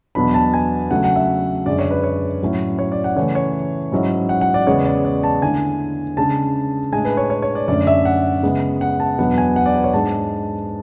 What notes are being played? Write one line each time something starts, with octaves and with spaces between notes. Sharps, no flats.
E2 B2 F#3 B3 D4 B5
A5
G#5
C#3 F#3 A3 D4 F#5
F#5
E5
F#2 D3 G#3 D5
C#5
B4
C#5
A2 F#3 C#4 E4
C#5
D5
F#5
C#3 E3 A3 C#5
C#5
G#2 F#3 C#4 E4
F#5
F#5
D5
E2 C#3 G#3 B3 C#5
D5
D5
A5
D3 A3 E4 G#5
C#3 G#3 D4 A5
A2 G#3 D4 G#5
B4
C#5
C#5
C#5
D5
F#2 D3 A3 C#4 D5
E5
F#5
C#3 G#3 B3
F#5
A5
E2 B2 F#3 B3 D4 F#5
G#5
F#5
D5
B4
C#5
G#2 G#3 D4 A5